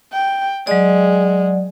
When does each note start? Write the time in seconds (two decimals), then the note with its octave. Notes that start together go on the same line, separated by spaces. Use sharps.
0.13 G5
0.67 F#3 G#3 D5